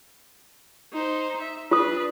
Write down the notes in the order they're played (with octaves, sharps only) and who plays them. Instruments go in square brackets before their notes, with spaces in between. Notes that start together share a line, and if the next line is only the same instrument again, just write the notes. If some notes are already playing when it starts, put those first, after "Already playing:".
[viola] D#4 C5
E5
[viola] D4 B4 [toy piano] F4 D#6